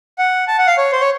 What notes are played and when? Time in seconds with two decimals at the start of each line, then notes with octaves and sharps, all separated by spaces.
0.18 F#5
0.48 A5
0.58 F#5
0.67 F5
0.78 C#5
0.92 C5
1.01 C#5